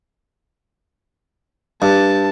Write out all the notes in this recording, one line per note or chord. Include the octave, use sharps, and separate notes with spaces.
G2 A5